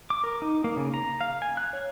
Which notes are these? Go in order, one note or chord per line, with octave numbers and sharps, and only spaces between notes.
D6
A#4
D#4
A#3
C#3
A#5
F5
G#5
F#6
C#5